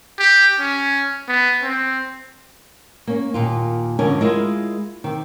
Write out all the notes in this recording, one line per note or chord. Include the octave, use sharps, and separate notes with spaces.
G4
C#4
B3
C4
A#3 C#4
D#2 A#2 F4
F2 G#2 D3 C#4 A#4 G#5
G#3 E4 F4 A#4 D#5
C3 D#3